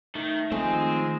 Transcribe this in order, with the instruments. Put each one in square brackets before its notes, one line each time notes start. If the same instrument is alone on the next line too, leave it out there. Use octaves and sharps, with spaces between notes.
[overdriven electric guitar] D#3 [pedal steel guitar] A3
[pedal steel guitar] D#3 F3 [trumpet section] G#3 G#5 [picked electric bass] A3 [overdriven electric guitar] C4